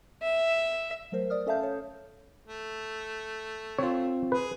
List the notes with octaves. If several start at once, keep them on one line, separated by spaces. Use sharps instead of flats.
E5
F#3 A3 A#4 C5
D5 D#6 F6
C#4 A4 E5 F5 A5 G6
C#5
A3
C4 F4 C#5
G#4 B4